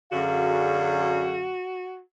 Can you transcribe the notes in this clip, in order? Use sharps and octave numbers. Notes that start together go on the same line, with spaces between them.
F#2 D3 F#4 G#4 F5